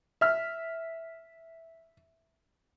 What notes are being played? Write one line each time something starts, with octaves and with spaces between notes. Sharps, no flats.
E5 F6